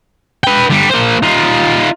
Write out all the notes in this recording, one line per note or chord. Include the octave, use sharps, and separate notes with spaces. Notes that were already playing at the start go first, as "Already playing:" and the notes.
B4 G5
D3 G3
A#3 C5
D#4 F4